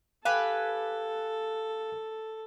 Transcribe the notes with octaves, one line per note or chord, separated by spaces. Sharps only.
G4 A4 B4 F5 G#5